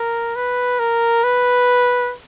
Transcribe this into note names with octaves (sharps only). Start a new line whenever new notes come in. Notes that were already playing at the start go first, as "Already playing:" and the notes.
Already playing: A#4
B4
A#4
B4